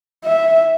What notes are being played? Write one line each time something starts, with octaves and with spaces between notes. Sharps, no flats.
E5